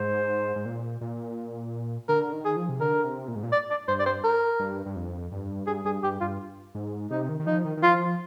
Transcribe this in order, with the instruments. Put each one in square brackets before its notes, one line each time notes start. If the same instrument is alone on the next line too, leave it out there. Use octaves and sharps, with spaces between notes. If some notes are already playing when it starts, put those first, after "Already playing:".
Already playing: [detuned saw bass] G#2 [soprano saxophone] C5
[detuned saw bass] G#2
A#2
A#2
[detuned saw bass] D3 [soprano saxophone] A#4
[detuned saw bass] D#3
[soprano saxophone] G#4
[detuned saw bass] F3
C3
[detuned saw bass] D3 [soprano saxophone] A#4
[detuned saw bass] C3
A#2
G#2
A#2
[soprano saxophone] D5
D5
[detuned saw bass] G2 [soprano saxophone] C5
[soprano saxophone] D5
C5
A#4
[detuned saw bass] G2
G2
F2
G2
[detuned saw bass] G2 [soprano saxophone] G#4
[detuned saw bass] G2 [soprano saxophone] G#4
[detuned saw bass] G2 [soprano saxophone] G4
[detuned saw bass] G2 [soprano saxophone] F4
[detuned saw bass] G#2
[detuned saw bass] C3 [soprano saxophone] D#4
[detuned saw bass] D#3
D#3
[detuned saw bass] F3 [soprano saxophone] D#4
[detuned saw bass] D#3
D#3
[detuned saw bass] F3 [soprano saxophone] F4